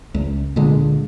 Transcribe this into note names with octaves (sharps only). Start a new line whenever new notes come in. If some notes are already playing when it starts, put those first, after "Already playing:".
C#2
A#2 D3 G#3